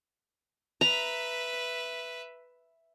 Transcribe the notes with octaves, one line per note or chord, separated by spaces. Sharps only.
B4 E5 A#5